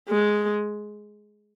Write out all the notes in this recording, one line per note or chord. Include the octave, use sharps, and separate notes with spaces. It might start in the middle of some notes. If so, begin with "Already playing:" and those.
G#3